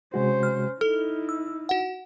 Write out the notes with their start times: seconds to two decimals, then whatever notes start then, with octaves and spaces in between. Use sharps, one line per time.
0.14 C3 G#3 C#4 F#4 C5
0.43 F6
0.81 D#4 E4 A4 F6
1.29 E6
1.69 F#4 F#5